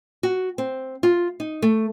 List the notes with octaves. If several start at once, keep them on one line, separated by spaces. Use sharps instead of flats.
F#4
C4
F4
D#4
A3